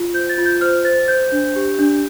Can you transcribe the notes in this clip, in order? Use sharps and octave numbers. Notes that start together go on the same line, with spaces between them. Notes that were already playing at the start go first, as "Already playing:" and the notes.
Already playing: F4
C5 G6
A6
F4
G6
C5 F6
C5 A6
C5 G6
D4
G4
D4